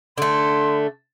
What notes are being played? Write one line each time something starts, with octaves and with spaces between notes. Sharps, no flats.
D3 A3 C6